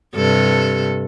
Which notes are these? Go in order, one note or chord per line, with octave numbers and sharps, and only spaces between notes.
G2 C3 A4